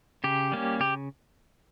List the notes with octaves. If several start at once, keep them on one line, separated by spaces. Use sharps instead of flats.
C#3 G4
G3 A#3 C#4
C#3 G4